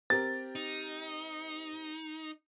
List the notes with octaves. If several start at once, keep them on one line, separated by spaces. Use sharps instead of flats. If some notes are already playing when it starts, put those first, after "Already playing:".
C4 G4 A#4 A6
D#4